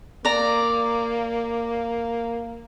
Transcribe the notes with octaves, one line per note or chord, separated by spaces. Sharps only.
A#3 D5 A#5